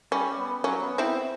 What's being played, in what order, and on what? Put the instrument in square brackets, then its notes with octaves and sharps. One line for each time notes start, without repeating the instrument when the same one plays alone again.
[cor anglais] G3 [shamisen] C#4
[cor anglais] B3
[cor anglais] F#3 [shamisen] C#4
[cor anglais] B3
[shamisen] C4 E4